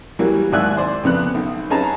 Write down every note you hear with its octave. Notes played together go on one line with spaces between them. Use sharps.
E3 F#3 G3 A#3
D#2 G#2 D5 E5 G#5 F#6
C5 D5
F2 C#3 B3 F#6
B1
C#4 D#4 G#4 B4 A5 A#5